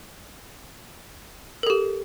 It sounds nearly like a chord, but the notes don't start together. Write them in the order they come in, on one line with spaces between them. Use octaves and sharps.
A#4 A4 G4